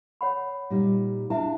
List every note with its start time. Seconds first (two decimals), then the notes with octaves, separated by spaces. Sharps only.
0.21 C#5 F#5 B5
0.70 A#2 G3 D#4
1.30 D4 E4 E5 F5 A5